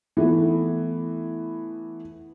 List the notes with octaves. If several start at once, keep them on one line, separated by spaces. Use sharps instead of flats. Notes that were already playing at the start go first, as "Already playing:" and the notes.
E3 A3 B3